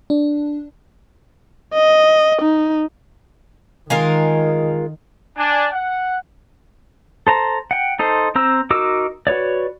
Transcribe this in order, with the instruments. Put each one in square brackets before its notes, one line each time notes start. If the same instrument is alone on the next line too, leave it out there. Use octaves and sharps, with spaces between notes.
[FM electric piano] D4
[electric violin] D#5
D#4
[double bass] D#3 [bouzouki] G#3 F4 A#4
[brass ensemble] D4 G#5
F#5
[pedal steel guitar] A4 C5 A#5
F#5 G5
D#4 A4 C5 C6
C4 C5 A#5 E6
D#4 F#4 A#4 D6 E6
F#4 B4 C#5 D5